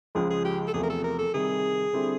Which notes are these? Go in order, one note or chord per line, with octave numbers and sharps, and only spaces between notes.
C#2 C#3 F3 G#3 G#4
G#4
G4
A4
E2 C3 F3 A3 G#4
A#4
A4
A#4
A4
C3 D#3 G3 G#4
D3 G3 C4 E4 G4